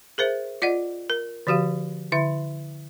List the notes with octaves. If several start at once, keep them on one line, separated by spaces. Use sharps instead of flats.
G#4 A#4 C5 E5
F4 D5 D#5 F#5
A#4
D3 F3 F#4 G4 F5
D3 E4 E5